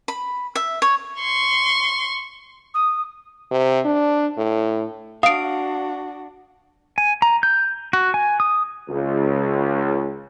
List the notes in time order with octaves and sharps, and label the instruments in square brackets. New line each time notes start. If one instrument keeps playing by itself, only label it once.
[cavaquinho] B5
E5
C#5
[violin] C6 C#6
[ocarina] D#6
[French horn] C3
D4
A2
[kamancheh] D4 F#4 [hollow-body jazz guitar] F5 [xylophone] D#6 D7
[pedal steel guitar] G#5
A#5
G6
F#4
G#5
D#6
[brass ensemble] C#2